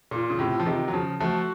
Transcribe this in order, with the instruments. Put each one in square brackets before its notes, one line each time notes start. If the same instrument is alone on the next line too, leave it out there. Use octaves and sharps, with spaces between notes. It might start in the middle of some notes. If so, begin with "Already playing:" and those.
[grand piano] A#2 [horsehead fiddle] F4
[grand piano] C#3
A2 C3
F3
C3 D#3
F#3
C#3 F3
[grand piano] F3 A3 [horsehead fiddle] F#4